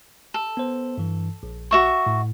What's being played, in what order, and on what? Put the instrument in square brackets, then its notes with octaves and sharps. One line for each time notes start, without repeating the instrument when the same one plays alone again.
[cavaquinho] A4
[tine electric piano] B3 C5
G2 E3
A#1
[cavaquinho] F#4 E5 C#6
[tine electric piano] A2